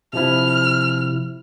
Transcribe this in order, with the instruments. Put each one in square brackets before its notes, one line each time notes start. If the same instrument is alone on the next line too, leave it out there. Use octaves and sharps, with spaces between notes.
[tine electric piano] C3 F3 E4 [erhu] F6